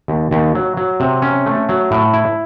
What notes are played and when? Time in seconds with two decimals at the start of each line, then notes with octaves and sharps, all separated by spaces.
0.08 D#2
0.31 D#2
0.55 F#3
0.77 F#3
1.00 C3
1.22 C#4
1.46 A3
1.69 F#3
1.91 A2
2.13 E4